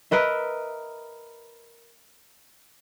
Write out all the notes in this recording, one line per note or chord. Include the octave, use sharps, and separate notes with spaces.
A#4 B4 D#5 E5